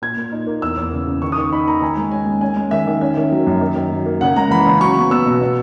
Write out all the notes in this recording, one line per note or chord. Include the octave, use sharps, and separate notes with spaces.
A#2 G#6
A#2
D#4
A#3
E2 E6
E2
C#3
C#3
D#3 C#6
D#6
D#3 C#6
D#4 B5
A#3 A#5
D#3 G#5
G#3
C#4 G#5
G#3
C#4 G#5
G#3
D#3 E5
D#3
C#4 E5
D#3
F#3
F#2
D#3
D#3
F#3
A#3
C#3 F#5
G#3 A#5
E3 B5
C#3
F#3 C#6
B3
B3 E6
B2
B2